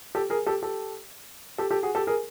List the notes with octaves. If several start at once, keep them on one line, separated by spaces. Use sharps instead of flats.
G4 A4
G#4 A#4
G4 A4
G4 A4
G4 A4
G4 A4
F#4 G#4
G4 A4
G#4 A#4